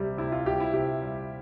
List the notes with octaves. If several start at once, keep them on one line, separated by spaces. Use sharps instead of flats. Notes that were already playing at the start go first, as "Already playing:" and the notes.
Already playing: C3 G3
C3 E4
F4
G3 G4
E4
C3 G4
G3